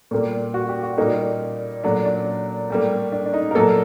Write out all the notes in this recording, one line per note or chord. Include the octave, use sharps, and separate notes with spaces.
A#2 G3 A#3
F#4
G4
F#4
A#2 G3 A#3 D#4
A#2 F#3 A3 D4
D4
A2 G3 A#3
D4
D4
D#4
A#4
A#2 F#3 A#3 A4